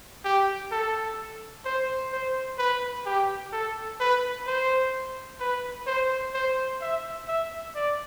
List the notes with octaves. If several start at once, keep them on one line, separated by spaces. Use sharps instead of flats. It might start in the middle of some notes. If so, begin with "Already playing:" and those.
G4
A4
C5
C5
B4
G4
A4
B4
C5
B4
C5
C5
E5
E5
D5